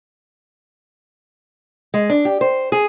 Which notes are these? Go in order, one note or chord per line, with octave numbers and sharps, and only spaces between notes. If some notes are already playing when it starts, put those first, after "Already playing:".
G#3
D4
G4
C5
G#4